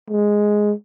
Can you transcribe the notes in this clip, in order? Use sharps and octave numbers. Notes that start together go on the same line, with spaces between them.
G#3